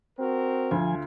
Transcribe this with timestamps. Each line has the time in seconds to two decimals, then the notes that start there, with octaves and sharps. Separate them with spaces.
0.19 C4 F#4 A#4
0.71 D2 F3 F4 G#5